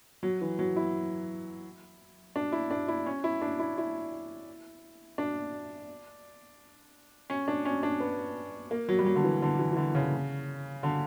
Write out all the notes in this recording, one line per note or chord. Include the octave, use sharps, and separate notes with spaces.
F#3
E3
F#3
E4
D4
E4
D4
E4
C#4
E4
D4
E4
E4
D4
C#4
D4
C#4
D4
B3
A#3
F#3
G3
F#3
D3
E3
D3
E3
E3
D3
C#3
D3